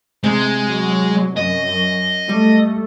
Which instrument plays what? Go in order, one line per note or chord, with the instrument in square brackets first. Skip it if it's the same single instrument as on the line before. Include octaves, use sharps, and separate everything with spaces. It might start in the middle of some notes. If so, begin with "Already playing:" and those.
[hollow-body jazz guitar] C3 [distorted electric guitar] G#3
[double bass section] F#3
[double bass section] F#2 [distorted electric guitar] D#5
[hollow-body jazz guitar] G3 [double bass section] A3